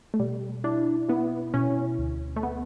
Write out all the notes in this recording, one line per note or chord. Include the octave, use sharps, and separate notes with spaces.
A3
B2 G3
D4 E4
B3 E4
B2 C#4
D2
A3
B3